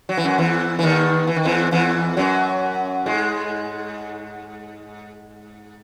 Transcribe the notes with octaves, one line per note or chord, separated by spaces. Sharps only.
F#3
E3
F#2 F#3
E2 E3
E3
D#2 D#3
E3
D#3
E2 E3
E2 E3
F#2 F#3
G#2 G#3